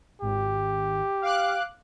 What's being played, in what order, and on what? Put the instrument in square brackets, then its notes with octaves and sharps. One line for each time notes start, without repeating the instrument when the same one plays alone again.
[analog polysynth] G#1 [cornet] G4
[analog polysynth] F5 D6 F#6